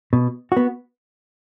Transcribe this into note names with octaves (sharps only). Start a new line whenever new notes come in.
B2
B3 F#4